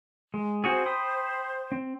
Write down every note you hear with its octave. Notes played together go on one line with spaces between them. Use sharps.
G#3
C4 F#4 G#4 C5
G5 B5 D#6
C4